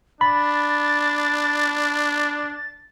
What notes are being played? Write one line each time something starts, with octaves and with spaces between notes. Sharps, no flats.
D4 B5 A6